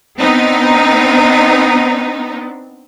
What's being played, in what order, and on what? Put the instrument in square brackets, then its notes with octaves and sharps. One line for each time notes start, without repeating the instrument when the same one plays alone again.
[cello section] B3 C4 D4 [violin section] D#4